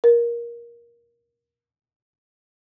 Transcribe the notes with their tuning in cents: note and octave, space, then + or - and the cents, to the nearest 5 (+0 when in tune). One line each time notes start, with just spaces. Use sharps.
A#4 +15